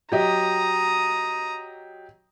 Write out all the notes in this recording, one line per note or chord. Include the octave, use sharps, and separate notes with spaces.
F#3 G4 D#5 A#5 D#6